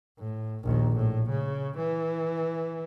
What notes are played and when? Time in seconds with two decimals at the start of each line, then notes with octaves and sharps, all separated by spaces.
0.19 A2
0.64 A#1 D#2
0.97 A2
1.30 C#3
1.78 E3